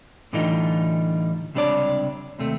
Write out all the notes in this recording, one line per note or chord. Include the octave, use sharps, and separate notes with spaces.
A2 D3 E3 G3 D#4 F4
C#2 C3 G3 D4 C#5 D5
D#2 C3 A3